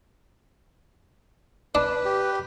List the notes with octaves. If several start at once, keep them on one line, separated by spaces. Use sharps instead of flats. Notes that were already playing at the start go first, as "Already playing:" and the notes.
D4 B4
G4